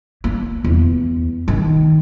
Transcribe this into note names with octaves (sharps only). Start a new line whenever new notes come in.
A#3
E2
D#3